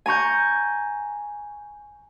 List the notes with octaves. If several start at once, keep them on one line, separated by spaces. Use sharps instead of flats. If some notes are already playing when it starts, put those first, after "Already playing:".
G#5 A#5 C#6 G6